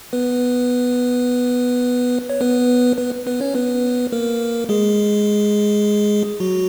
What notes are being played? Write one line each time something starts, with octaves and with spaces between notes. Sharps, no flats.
B3 B4
C#5
B3 B4
B3 B4
B3 B4
C#4 C#5
B3 B4
A#3 A#4
G#3 G#4
F#3 F#4